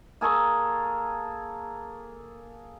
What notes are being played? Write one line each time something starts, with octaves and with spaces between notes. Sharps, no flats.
A#3 G#4 A4 C#6